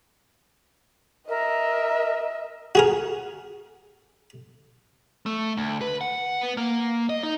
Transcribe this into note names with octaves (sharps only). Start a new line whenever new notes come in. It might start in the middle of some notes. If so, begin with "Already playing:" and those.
A#4 D#5 E5
F#4 G#4 A#4
A3
D2
B4
F#5
B3
A#3
D#5
D#4